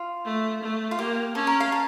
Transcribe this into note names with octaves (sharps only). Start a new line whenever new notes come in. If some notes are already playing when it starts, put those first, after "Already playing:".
Already playing: F4
A3
A3
F4
A#3 G4
C#4 A4
A#4
F5
A5